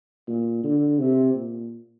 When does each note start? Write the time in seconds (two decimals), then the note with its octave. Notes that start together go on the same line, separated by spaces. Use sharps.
0.28 A#2
0.64 D3
0.99 C3
1.35 A#2